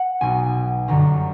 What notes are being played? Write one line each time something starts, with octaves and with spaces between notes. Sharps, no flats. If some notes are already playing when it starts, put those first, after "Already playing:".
Already playing: F#5
B1 B2 F#3 G#5
G1 F#2 D3 F#3 A#5